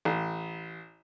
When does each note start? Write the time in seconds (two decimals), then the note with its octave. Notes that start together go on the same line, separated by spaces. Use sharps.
0.05 A1